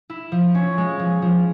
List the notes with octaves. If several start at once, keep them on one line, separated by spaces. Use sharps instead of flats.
E4
F3
C#4
G#3
F3
F3